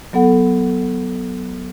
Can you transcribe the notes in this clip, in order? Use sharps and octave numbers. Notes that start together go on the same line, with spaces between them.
F#3 B3 A4 F#5